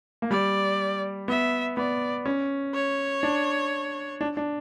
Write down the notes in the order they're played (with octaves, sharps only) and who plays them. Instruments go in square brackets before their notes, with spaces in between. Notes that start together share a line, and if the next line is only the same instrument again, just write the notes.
[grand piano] A#3
[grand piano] G3 [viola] D5
[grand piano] B3 [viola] E5
[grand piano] B3 [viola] D5
[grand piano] C#4
[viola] C#5
[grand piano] D4
D4
D4